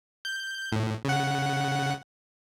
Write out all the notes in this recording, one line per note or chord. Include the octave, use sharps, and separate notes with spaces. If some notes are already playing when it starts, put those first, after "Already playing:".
G6
A2
C#3 F#5